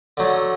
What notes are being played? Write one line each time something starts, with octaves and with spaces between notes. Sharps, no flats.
D3 F#3 A3